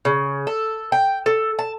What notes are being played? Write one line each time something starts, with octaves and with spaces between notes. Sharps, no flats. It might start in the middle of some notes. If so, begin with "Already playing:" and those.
C#3
A4
G5
A4
A5